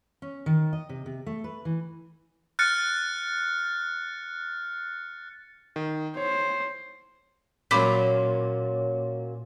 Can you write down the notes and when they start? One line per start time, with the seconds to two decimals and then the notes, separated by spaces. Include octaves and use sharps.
0.22 C#4
0.46 D#3
0.73 D#5
0.89 C3
1.06 C3
1.26 A3
1.44 B4
1.65 E3
2.59 F6 F#6 A6 C#7
5.76 D#3
6.17 C5 C#5
7.71 A#2 F#3 A#3 C#4 B5 D6 B6